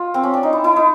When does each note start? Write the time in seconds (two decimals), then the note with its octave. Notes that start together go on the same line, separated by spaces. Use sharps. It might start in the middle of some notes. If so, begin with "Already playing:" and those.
Already playing: F4
0.14 C4
0.23 C#4
0.34 D4
0.43 D#4
0.53 E4
0.64 E4
0.76 D#4